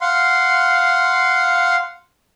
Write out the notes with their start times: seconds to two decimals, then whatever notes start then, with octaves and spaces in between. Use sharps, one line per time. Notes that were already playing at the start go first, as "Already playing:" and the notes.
0.01 F5 F#5 C6